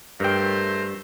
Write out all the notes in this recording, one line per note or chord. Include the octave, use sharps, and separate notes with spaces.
G2 A3 A#4 C5 G5